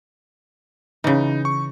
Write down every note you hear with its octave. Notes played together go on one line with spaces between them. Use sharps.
C#3 E3 D#4
C#6